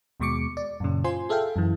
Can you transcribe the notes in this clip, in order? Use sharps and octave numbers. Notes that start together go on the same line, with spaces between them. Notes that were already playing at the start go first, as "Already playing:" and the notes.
D#2 B2 G#3 C#6 D6 C#7
D5
F#2 A#2 C#3
F4 C5 G#5 C6
G#4 A4 E5 F5 G5
F#2 E3